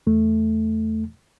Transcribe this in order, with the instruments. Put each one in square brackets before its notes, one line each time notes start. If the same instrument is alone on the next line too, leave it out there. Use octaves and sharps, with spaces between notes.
[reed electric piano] E2 A3